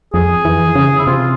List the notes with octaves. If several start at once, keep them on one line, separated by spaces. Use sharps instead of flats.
F2 G#4
E3
C#3
E4
C3 F4